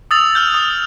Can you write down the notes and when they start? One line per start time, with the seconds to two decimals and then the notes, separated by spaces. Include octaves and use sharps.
0.11 D#6 E6 A6 F7
0.35 F6 G6
0.54 D#6